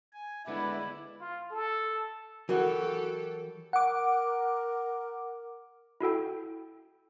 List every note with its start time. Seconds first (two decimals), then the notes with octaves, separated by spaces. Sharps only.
0.13 G#5
0.47 D3 G#3 B3 E4 B4 D5
1.21 F4
1.51 A4
2.49 E3 F#3 F#4 G4 A4 A#4
3.73 A#4 F#5 D6
6.01 E4 F#4 A4 G5